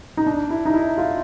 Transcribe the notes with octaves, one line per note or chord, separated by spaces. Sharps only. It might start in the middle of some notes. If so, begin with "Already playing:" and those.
D#4
D4
E4
D#4
E4
F4